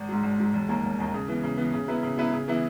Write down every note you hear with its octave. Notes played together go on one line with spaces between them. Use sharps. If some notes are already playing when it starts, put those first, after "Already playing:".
Already playing: G#1
G#2 F#3
G#1
G#2 F#3
E1
D#2 D#3 A#3
E1
D#2 D#3 A#3
C#3
E3 B3
C#3
E3 B3
C#3
F#3 B3 E4 B4
C#3
F#3 B3 E4 B4
C#3
E3 B3 E4